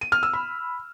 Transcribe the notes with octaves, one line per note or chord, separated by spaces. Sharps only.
D#7
F6
E6
B5